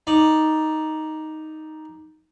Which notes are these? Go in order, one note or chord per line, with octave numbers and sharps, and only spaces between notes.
D#4 D5